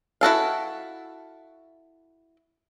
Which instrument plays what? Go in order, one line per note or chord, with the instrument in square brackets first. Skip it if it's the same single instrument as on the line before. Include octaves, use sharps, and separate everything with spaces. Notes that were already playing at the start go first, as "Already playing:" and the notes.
[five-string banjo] E4 F#4 A4 F5